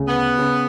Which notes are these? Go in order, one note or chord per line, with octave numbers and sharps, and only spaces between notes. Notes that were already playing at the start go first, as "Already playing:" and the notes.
Already playing: D2 C#3
B3
C#3